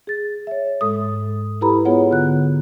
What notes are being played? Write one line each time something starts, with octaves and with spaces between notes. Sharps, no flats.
G#4 A6
C#5 E5
G#2 G#3 A4 D#6
E4 G4 A4 B4 A#5 B5
B3 F4 G#4 C#5 F#5
D3 F#6